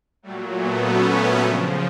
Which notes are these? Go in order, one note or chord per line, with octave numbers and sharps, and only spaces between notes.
A#2 F#3 G3 A3
A3 B3
B3 C#4
C#3 F3 C4 D4